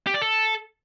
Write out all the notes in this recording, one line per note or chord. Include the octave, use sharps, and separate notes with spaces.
G4
D5
A4